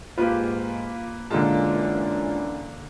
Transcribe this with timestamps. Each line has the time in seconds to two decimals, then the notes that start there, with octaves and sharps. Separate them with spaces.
0.18 G#2 A#3 F4 G4 B4
1.30 F#2 A#2 D3 E3 G#3 D4 F4 A5